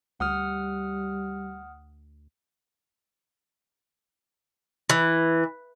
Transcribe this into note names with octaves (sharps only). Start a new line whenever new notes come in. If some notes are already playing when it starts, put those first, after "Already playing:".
D2 G3 F#5 D#6 F6
E3